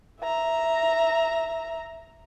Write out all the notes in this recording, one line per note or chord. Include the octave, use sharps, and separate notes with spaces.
E5 A#5